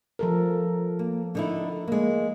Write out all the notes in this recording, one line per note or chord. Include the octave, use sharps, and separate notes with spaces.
F3 A4 A#4
A#3
D3 D#4 E4
G#3 A#3